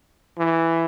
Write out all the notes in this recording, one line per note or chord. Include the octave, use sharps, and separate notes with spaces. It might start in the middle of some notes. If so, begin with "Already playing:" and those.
E3